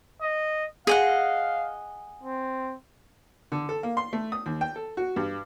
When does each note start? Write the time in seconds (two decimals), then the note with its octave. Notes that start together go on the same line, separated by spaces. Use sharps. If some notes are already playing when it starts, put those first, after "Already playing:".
0.21 D#5
0.87 G#4 D#5 F5 F#5
2.23 C4
3.52 D3
3.69 A4
3.83 A#3
3.97 C6
4.13 A3
4.32 D#6
4.46 D#2
4.61 G5
4.76 A4
4.97 F#4
5.16 G2